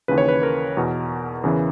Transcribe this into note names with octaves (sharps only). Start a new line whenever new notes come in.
D#2 C#3 E3 B4
C#5
B4
A#4
E2 B2
E2 C#3 E3